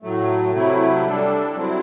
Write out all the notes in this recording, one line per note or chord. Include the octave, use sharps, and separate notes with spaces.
A2 F#3 A3
C3 F#3 A3 E4
G3 D4 A4
F#3 C4 E4